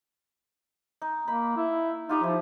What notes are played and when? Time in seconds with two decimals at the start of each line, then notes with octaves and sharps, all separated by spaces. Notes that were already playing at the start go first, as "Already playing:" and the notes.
1.02 D#4
1.28 A#3 D#4 B5
1.57 E4
2.09 D#4 F4 G4 D#6
2.23 F3 E4